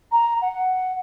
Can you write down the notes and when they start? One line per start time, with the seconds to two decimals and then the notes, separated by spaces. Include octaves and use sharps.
0.12 A#5
0.41 F#5